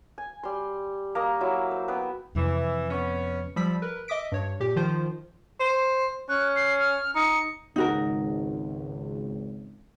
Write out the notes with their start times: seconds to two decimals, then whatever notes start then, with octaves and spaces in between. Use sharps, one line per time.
0.18 G#5
0.43 G3 C6
1.15 A#3 A#4 D#5
1.41 F#3 E4 E5
1.71 C5
1.88 B3 B4 E5 G5
2.35 F2 C3 E3
2.90 B3 C#4
3.56 F3 G3 B5 E6 B6
3.82 A#4 B4
4.08 D#5 E5 D6 D#6 B6 D7
4.32 G2 C#5
4.60 A#2 G4
4.76 D#3 F3 F4 C5
5.60 C5
6.29 C#4 F#6
6.56 C7
6.80 F6
7.15 D#4 C#7
7.76 G#1 C#2 D#4 F#4 A#4